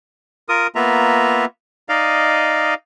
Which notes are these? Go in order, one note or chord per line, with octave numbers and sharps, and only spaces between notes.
F4 A#4 D#6
A#3 B3 F4 E5 A#5
D#4 D5 D#5 F5